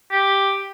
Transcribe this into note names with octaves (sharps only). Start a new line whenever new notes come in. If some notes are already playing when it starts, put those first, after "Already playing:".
G4